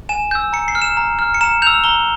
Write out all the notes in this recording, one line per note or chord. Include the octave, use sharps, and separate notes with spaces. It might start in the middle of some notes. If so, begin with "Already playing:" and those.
G#5 E7
E6 G6
A#5 C#7
C7
F6
E7
A#5
F6
C#7
A#5 E7
E6 G6 F7
A#5 G7